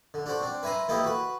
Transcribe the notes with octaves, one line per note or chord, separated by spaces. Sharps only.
D3
D4 F#4 C5
C4 D4
B4 E5 G#5 A#5 C6
E3 A#3 E4 G4 A4 D#5
F#4 B4